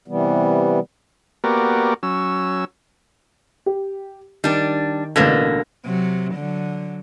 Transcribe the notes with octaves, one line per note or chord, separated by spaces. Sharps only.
C3 E3 G3 B3
A#3 B3 F#4 G4 A#4 D5
F#3 C#4 E6
G4
D#3 G3 D4
A1 B2 D3 A#3 B4 G#6
C3 F#3
D3 F#3